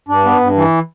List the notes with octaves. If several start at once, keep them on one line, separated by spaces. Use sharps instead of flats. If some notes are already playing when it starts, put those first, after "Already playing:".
G2 D4
B3
G2
E3